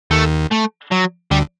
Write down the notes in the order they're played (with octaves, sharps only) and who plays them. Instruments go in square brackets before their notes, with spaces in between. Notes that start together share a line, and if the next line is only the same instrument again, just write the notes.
[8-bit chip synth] D#2 D#3 [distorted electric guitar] A3
[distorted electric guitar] A3
F#3
[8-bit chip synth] D2 D3 [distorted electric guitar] G3